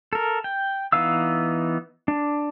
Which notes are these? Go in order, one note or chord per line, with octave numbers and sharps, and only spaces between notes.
A4 A#4
G5
E3 B3 D#4 F5 E6
D4